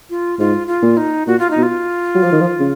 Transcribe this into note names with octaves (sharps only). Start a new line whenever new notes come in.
F4
G#2 F4
F4
A#2
D#4
A#2 F#4
F4
D#4
B2
F4
F#3
F3
D#3
F3
C#3